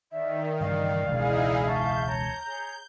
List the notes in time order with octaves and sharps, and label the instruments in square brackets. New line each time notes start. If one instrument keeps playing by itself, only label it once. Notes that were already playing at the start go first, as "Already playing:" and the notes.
[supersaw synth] D#3 [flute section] D5 [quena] E5
[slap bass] G2 C#3 E3 [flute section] D5 [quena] F5
[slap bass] E1 C#2 B2 [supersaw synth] D#4 E4 G#4
[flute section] E5 A5 C#6 [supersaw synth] G6
[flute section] C#5 A5 [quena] A#5
[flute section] G#4 C#5